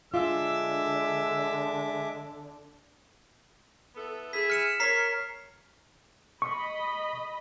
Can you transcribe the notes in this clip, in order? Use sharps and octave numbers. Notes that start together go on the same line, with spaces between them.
D3 G#3 D4 F4 E5 D6 E6
B3 E4 A4
E4 G#4 B6
F6 C#7 E7
A#4 C#5 A#5 B6 C7
D#5 B5 C#6